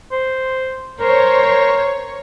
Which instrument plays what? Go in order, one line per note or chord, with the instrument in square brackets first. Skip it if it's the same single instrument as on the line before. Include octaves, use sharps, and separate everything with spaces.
[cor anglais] C5
[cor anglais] A#4 [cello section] C5 [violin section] C#5